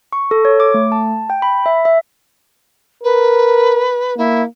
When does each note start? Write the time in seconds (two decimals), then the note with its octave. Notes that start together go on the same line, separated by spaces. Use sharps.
0.13 C#6
0.31 A4
0.45 C#5
0.60 D6
0.74 A3
0.92 A5
1.30 G5
1.42 B5
1.66 E5
1.85 E5
3.03 A#4 B4
4.17 A#3 E4